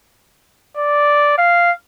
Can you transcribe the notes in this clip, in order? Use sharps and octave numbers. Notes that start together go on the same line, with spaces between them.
D5
F5